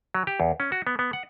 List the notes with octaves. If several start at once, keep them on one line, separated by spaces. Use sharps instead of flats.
F#3
G4
E2
C#4
F#4
B3
B3
F#5